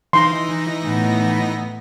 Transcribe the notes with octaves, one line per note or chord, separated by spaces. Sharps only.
E3 D#4 C6 A#6
A2 B3